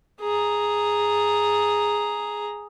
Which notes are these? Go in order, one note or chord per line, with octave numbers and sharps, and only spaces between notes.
G#4 A#5